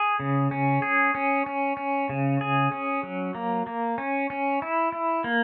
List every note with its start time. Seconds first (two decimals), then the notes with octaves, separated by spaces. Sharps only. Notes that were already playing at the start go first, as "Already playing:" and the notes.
Already playing: G#4
0.20 C#3
0.51 C#4
0.82 G#4
1.15 C#4
1.46 C#4
1.77 C#4
2.09 C#3
2.41 G#4
2.72 C#4
3.03 F#3
3.35 A#3
3.67 A#3
3.98 C#4
4.30 C#4
4.62 E4
4.92 E4
5.24 A#3